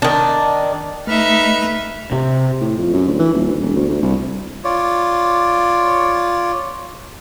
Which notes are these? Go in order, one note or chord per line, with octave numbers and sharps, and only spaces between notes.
D#3 D4
A3 D#4 B4 E5 F6
C3
A2
F2
F#2
D2
E3
D#1
D2
E1
D2
D2
C2
F4 C#5 D5